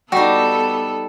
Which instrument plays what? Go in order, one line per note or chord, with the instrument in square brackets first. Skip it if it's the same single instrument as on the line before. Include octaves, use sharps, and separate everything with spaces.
[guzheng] G3 D#4 [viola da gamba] B3 A4 [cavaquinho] F#4